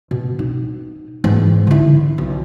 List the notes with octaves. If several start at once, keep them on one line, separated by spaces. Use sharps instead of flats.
B2
D#4
G#2 E3
D3 E4
B1